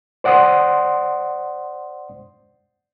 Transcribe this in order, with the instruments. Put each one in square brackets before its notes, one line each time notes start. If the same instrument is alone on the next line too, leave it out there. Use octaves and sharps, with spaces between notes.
[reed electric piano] C5 D5 F#5 C6 D#6